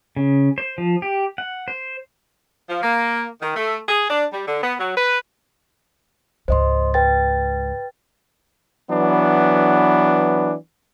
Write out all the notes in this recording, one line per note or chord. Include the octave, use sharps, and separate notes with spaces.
C#3
C5
F3
G4
F#5
C5
F3
A#3
D#3
A3
G#4
D4
G3
D3
B3
F#3
B4
C#2 G#2 C5 D#5 C6
B4 G5 A6
E3 F#3 B3 D4